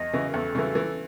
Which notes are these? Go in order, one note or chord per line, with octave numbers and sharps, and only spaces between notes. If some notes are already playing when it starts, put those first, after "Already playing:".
Already playing: E2 D#5
C#3 E3
A#4
E2 A4
C#3 E3
E3